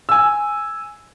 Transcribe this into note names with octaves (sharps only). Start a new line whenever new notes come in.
G#5 E6